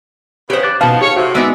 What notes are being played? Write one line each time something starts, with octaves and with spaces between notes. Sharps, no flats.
C#3 B3 G4 C5
D6 F#6 A6
B2 F3 B3 D#4 F5 A5
G4 G#4 C#5 F5
A2 C3 F#4
G#3 B3 D#4 D5 E5